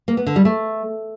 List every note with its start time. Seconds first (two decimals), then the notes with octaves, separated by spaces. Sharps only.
0.08 A#3
0.17 B3
0.26 D3
0.36 G3
0.45 A3